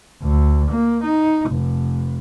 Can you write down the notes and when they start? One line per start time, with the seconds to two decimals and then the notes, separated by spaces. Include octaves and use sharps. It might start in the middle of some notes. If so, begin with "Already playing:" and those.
0.22 D2
0.71 A#3
1.03 D#4
1.50 F1